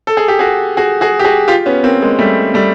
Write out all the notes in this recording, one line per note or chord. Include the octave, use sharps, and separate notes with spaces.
A4
G#4
G4
F#4 G#4
F#4 G#4
F#4 G#4
G4
F#4 G#4
F4 G4
B3 C#4
A#3 C4
G#3 A#3
G3 A3
G3 A3